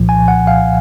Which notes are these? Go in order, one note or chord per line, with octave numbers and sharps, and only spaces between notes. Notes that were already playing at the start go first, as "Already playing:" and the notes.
Already playing: C2 A#2 F3
G#5
F#5
F5